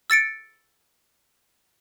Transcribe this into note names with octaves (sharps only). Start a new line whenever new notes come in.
E6 A6 C#7 D7